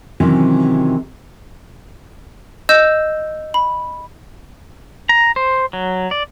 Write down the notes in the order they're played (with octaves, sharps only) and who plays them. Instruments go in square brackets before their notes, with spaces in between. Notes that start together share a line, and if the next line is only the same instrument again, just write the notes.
[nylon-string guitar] C3 D#3 E3 F#3 C4 C#4
[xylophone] D#5 E6 G6 E7
B5
[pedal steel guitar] A#5
C5
F#3
D5